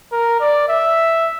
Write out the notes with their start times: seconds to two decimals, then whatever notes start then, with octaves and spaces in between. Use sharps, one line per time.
0.12 A#4
0.40 D5
0.68 E5